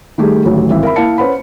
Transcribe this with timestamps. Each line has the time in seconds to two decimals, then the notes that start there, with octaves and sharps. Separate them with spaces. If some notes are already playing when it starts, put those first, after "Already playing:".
0.18 D#3 G3 A3 G4 G#4
0.45 A1 D2 D#3 F#3
0.70 G#1 E3 E5
0.83 A#4 E5 B5
0.96 A#3 E4 F5 A5 C#7
1.18 C#4 B4 C5 F#5 B5